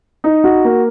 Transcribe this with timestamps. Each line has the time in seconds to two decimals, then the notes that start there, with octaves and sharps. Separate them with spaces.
0.24 D#4
0.44 F#4
0.64 A#3